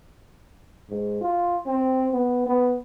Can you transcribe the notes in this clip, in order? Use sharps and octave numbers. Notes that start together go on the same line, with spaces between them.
G#2
F4
C4
B3
B3